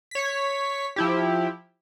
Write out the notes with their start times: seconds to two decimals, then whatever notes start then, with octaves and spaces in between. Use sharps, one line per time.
0.11 C#5 B6
0.96 F3 E4 G4